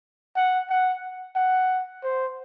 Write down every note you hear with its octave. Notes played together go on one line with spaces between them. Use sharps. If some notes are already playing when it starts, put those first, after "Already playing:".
F#5
F#5
F#5
C5